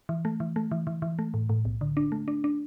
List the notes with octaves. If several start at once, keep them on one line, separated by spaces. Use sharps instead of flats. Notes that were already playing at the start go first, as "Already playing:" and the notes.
E3
A3
E3
A3
E3
E3
E3
A3
A2
A2
B1
D3
D4
A3
D4
D4